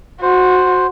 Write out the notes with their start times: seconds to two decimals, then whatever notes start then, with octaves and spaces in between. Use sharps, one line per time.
0.22 F#4 C5